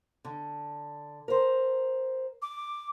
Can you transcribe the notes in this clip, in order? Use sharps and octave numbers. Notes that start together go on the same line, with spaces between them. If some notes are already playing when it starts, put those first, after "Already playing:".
D3
A#4 C5
D6